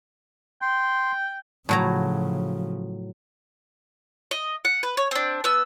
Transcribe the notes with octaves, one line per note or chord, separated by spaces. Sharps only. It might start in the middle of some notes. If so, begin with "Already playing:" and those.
G5 C6
A2 C#3 F3 F#3 A#5
D#5
F#5
B4
C#5
C4 D4
B3 E6